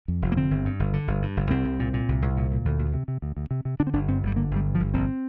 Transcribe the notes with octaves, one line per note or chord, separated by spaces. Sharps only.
F2
F1
A#3
D3 C4
G1
G2
G1
D3
G1
G2
G1
C2 C4
C2
A#2
A#2
C2
C2
A#2
A#2
D2
D2
C3
C3
D2
D2
C3
C3
D3 D4
C4
G1 D4
G2 C4
G1 G3
D3 A#3
G1 G3
G2
F3
G1
A#1 C4